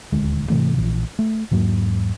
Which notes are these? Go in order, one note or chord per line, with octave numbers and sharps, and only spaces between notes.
D#1 D2 G#3
G#2 C3 E3 A3
A#1 A#2 E3
A3
E2 G#2 F#3 A#3